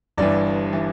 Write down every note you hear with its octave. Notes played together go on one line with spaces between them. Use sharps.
G1 G2 E3 D5
E3